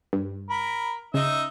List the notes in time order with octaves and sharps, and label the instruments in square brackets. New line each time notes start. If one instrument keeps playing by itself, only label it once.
[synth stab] G2
[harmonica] A#4 B5
[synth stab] C#3 [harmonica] D#4 D#5 E5